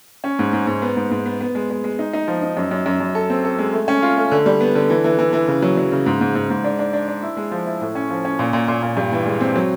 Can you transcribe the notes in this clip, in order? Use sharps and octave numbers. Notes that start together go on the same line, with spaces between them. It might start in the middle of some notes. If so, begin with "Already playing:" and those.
C#4
G#2
G#2
G#2
B3
G#2
G#2
B3
B3
G#3
G#3
G#3
D#4
D#4
F3
D#4
F#2
F#2
F#2
F#2
A4
C4
A4
G#3
A3
C#4
F4
A3
D3
G3
B3
D3
E3
E3
E3
E3
C#3
F#3
F#3
C#3
G#2
G#2
G#2
G#2
D4
D4
D4
D4
E4
G#3
F3
E4
A2
C#4
F3
C#4
A#2
A#2
A#2
A#2
G2
E3
G#3
C4
F#3